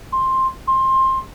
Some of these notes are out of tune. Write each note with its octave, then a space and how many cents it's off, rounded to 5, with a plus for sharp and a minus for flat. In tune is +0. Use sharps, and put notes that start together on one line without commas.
C6 +10
C6 +20